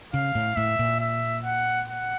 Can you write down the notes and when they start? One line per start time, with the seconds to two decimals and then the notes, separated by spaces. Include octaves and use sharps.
0.14 C#3 F5
0.35 A2
0.56 A2 E5
0.79 A#2
1.00 E5
1.44 F#5
1.88 F#5